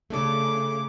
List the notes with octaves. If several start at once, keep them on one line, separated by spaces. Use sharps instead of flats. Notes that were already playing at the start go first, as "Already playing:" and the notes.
C#3 A3 D4 A4 D6